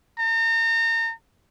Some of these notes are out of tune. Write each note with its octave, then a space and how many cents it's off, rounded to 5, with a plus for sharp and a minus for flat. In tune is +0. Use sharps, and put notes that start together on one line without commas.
A#5 -35